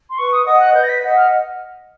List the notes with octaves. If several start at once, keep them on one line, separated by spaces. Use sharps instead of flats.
C6
B4 C#6
D#6
D#5 F#5 D#6
F#6
B4 G6
A#6
B6
D#5 F#5
F6